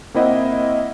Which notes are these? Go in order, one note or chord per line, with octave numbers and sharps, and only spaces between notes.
A#3 C4 E4 D#5 E5 F#5